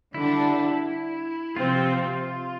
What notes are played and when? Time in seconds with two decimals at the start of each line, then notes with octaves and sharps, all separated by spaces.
0.14 D3 G3 D4 E4
1.56 C3 F3 C4 F4